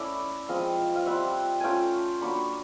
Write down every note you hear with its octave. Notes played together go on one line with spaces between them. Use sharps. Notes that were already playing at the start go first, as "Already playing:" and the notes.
Already playing: A3 C#4 E4 D5 E5
F3 G#3 C4 D#5 F5
F5
G3 C4 F4 E5 F#5
A3 C#4 F4 F5 G5 G#5
F#3 A#3 D4 B5 C#6